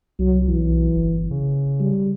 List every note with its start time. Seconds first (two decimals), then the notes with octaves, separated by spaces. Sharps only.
0.19 C2 F#3
0.48 B1 E3
0.96 G1
1.31 C#3
1.80 G3